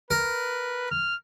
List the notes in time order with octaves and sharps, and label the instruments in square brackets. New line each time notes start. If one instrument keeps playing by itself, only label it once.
[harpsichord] A#4 [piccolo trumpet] B4
[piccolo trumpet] F6